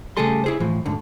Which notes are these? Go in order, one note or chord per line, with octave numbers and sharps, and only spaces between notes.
C#3 G3 A3 G#4 A4 C6
E4 G#4 C5
A2 E3 F3
D2 G#2 D3